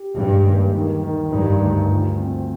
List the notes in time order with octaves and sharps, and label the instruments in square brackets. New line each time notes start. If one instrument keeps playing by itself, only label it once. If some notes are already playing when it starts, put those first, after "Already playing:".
Already playing: [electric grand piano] G4
[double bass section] G2 [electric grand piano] G#3
[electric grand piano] D#2
D#3
D#3
[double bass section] G2 [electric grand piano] D#4
[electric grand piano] D2
F4
C4